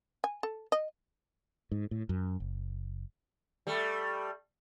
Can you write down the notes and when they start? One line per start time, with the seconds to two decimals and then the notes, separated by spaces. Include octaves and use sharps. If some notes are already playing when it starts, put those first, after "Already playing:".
0.24 G#5
0.43 A4
0.72 D#5
1.72 G#2
1.91 A2
2.09 F#2
2.40 F#1
3.67 G3 A3